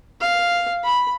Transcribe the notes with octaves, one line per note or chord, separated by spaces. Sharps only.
F5
B5